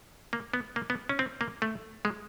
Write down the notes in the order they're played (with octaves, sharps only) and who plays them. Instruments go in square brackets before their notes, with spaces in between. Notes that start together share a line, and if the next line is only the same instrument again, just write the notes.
[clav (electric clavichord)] A#3
B3
A#3
B3
C#4
C4
A#3
A3
G#3